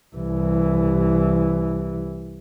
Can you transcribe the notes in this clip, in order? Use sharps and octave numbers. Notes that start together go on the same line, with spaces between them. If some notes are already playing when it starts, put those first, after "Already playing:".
C2 E3